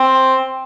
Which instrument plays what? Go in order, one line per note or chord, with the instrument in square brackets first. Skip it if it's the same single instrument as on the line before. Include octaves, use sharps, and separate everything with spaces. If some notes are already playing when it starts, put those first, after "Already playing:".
Already playing: [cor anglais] C4